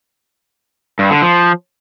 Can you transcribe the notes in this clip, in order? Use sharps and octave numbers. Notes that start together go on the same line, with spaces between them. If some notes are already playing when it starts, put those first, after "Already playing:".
G2
D3
F3